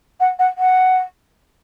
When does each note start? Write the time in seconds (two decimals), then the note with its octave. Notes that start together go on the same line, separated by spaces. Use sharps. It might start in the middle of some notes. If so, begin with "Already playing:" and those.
0.20 F#5
0.39 F#5
0.58 F#5